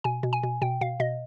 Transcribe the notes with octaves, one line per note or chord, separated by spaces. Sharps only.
B2 G#5
B2
G#5
B2
B2 G5
B2 F5
B2 D#5